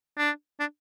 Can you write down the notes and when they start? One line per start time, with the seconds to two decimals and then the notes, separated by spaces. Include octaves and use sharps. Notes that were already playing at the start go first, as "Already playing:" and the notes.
0.17 D4
0.60 D4